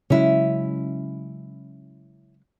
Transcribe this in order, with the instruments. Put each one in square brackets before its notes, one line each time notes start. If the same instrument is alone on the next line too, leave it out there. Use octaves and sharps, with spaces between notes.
[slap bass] C#3 F#3 G#3 [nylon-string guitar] C#4 E4